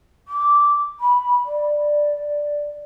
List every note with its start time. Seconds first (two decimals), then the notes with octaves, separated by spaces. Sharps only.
0.28 D6
1.00 B5
1.45 D5